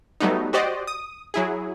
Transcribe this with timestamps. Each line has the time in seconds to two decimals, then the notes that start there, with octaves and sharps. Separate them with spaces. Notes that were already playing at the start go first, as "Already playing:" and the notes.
0.20 F#3 G3 A3 B3 D#4
0.53 F#4 G4 C5 D5 D#5
0.87 D#6
1.34 F#3 E4 G#4